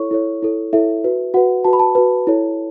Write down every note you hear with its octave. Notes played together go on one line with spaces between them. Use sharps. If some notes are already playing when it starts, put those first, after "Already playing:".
Already playing: E4 A4 C#5 C#6
E4 A4 C#5
E4 A4 C#5
E4 A4 C#5 E5
F#4 B4
F#4 B4 F#5
F#4 B4 A5
B5
A5
F#4 B4
E4 A4 C#5